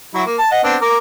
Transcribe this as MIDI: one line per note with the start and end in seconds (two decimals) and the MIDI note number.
0.14 0.22 54
0.14 0.22 64
0.26 0.37 58
0.39 0.50 81
0.51 0.60 75
0.51 0.60 78
0.64 0.76 59
0.64 0.76 60
0.64 0.76 62
0.81 0.98 70
0.81 0.98 86